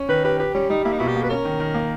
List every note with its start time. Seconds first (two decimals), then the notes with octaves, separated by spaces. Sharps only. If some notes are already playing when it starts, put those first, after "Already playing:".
Already playing: C#4
0.09 D#3 B4
0.24 G4 B4
0.39 G4 B4
0.55 G3 C#4
0.70 G3 D#4
0.85 A#3 E4
0.92 D#4
0.99 B2 E4
1.08 G4
1.15 A#3
1.23 B4
1.29 C#4 A#4
1.45 D#3
1.60 D#3
1.75 A#3